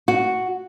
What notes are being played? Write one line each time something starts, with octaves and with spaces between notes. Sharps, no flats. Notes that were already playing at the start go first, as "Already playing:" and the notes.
F#4